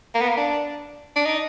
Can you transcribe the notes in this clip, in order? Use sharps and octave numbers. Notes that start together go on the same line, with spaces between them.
A#3
B3
A#3
D4
D4
D#4